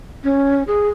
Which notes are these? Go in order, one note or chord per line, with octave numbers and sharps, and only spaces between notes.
C#4
G#4